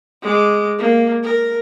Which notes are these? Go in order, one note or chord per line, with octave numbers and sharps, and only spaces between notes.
G#3 D6
A#3
A#4